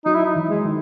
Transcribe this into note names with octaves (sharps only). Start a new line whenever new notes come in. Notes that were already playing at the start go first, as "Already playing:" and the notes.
F#3 D#4
E4
D#4
E3
G#3
D#3